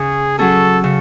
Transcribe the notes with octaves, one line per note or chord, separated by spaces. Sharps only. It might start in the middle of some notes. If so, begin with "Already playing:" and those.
Already playing: C#3 G#4
F#3 C#4 G#4 A4
C#3